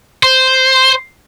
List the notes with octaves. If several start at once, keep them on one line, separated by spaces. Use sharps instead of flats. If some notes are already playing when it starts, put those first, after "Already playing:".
C5